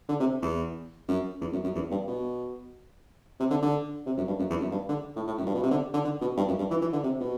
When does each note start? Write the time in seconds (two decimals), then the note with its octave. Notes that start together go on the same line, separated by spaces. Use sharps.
0.09 D3
0.20 C3
0.42 E2
1.08 F#2
1.41 E2
1.52 F#2
1.64 F#2
1.75 E2
1.91 G2
2.07 B2
3.40 C3
3.51 D3
3.62 D3
4.06 C3
4.17 F#2
4.28 G2
4.39 F#2
4.50 E2
4.61 F#2
4.72 G2
4.89 D3
5.16 A2
5.27 A2
5.38 F#2
5.46 G2
5.55 B2
5.63 C3
5.71 D3
5.94 D3
6.04 D3
6.21 B2
6.37 G2
6.48 F#2
6.59 G2
6.70 E3
6.82 E3
6.93 D3
7.03 C3
7.20 B2